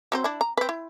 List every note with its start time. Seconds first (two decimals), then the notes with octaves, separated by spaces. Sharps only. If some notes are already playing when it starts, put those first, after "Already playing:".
0.12 F#3 C4 C5
0.24 D4 E4
0.41 A#5
0.57 C4 B4
0.69 E4